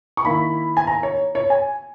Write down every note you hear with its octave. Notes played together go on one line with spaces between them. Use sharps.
C#6
D#3 A#3 E4 B5
G#5
A#5
C#5
C#5
G#5